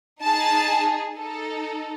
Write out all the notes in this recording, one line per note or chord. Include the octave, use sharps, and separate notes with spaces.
D#4 G#4 A5
D#4 A4